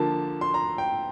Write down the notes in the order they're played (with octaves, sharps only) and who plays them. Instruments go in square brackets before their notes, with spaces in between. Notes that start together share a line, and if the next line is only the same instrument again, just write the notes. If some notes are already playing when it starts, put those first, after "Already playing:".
Already playing: [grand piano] D3 F3 A#3 A5
C6
A#5
G5